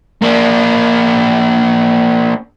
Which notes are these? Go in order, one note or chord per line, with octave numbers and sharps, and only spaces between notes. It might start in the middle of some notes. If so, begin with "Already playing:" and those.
A#3 D4